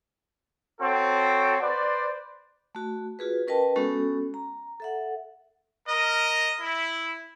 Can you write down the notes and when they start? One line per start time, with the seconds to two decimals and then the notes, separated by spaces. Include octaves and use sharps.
0.80 C4 F#4 A4 C#5
1.60 B4 C5 D5
2.75 A3 F#4
3.19 F4 F#4 G#4 B4
3.47 C#4 A#4 B4 D#5 G5 A5
3.76 G#3 B3 C#4 F#4 A4
4.34 A#5
4.80 A4 E5 F#5
5.86 A#4 D#5
6.59 E4